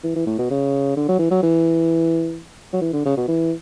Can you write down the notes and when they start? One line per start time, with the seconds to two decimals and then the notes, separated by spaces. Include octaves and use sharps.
0.04 E3
0.16 E3
0.27 A2
0.39 B2
0.51 C#3
0.97 D3
1.09 F#3
1.19 E3
1.31 F#3
1.43 E3
2.73 F#3
2.82 E3
2.93 D3
3.06 C#3
3.17 B2
3.28 E3